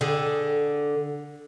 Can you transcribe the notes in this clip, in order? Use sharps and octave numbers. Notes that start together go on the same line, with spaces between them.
D3 G#4